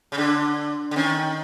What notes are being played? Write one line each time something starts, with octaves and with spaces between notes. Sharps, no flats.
C#3
D3 D4
D3
D#3 C#4